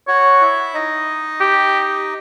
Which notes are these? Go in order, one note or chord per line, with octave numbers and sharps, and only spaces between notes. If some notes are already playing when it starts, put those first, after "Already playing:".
F#4 C#5 F#5
E4 E5
D#4 D#5
G4